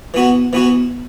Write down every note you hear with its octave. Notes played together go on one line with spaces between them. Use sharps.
E3 B3 F#4
E3 B3 F#4